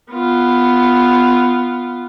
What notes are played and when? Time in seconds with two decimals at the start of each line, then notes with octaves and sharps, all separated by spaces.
0.11 B3 F4